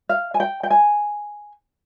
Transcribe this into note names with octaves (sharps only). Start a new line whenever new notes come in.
F5
G#5
G5
G5
G#5